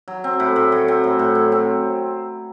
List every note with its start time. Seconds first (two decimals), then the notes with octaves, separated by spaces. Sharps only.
0.08 F#3
0.24 C4
0.40 A2
0.56 A2
0.72 F#3
0.88 C4
1.04 A2
1.19 A2
1.35 F#3
1.52 C4